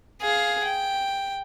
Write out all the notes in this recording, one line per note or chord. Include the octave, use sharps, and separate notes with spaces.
G#4 F5
G5